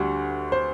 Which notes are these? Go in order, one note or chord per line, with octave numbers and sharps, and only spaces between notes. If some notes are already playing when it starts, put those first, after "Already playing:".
Already playing: D2 D3 G3 F#4
C5